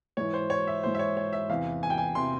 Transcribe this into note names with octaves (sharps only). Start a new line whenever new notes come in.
G#2 E3 C#5
C5
C#5
E5
G#2 E3 C5
E5
C#5
C#5
E5
E2 C3 E3 F5
G#5
G5
G#5
C3 E3 C6